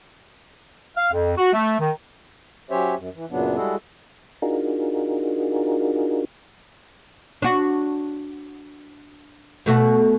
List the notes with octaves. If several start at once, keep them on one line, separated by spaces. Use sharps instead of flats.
F5
F2
F#4
A3
D#3
F#3 C#4 G4 C5 C#5 E5
F#2
E3
F#2 A#2 C#3 F#3 B3 D4
G3 G#3 E4 F#4 G#4 A4
D4 D#4 F4 F#4 G#4 A#4
D4 F#4
B2 A3 F#4